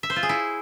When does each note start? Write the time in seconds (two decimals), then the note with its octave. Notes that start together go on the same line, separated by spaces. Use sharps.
0.03 E5
0.10 C5
0.16 F4
0.23 G#4
0.29 E4